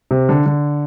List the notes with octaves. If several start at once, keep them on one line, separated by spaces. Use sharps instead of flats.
C3
D3
D3